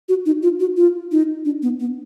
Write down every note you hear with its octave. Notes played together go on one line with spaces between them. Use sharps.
F#4
D#4
F4
F#4
F4
D#4
D4
B3
B3